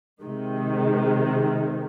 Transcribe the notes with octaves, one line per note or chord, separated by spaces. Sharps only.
C3 D#3 G#3